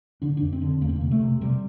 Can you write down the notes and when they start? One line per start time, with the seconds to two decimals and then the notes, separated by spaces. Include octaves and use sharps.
0.22 D3 D4
0.37 F2 D4
0.52 C4
0.62 D3
0.81 E2 A#3
0.89 C4
0.96 A#3
1.01 C3
1.11 A3
1.21 C3
1.41 C3 G3